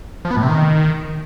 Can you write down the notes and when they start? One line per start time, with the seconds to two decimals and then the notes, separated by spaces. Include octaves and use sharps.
0.25 F3
0.31 B3
0.37 A2
0.43 C3
0.49 D#3